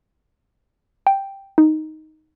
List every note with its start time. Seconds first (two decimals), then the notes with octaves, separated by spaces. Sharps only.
1.07 G5
1.58 D#4